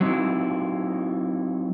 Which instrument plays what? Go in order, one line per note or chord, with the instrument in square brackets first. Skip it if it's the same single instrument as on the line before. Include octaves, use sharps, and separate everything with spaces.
[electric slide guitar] F#3 C4 D#4 E4